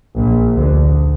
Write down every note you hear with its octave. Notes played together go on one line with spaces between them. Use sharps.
A#1 A#2
D2 D3